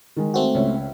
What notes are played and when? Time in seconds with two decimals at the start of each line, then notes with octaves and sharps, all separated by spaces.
0.16 D#3 G#3
0.34 A3 C4 F#4
0.55 C#2 C#5 E5